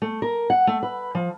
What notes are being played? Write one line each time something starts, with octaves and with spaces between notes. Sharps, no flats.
A3
A#4
F#5
A3
B4
F3